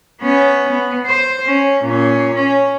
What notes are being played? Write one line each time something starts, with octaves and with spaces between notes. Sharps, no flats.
B3 C#4
B3
C5
C#4
A#2 C#4
C#4